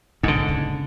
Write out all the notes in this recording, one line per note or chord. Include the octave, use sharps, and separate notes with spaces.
A1 G#2 D3
D#1 C#3